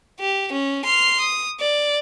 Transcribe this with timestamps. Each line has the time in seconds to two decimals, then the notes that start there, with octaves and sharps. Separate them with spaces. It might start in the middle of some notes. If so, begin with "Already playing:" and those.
0.20 G4
0.52 C#4
0.85 C6 F6
1.20 D#6
1.60 D5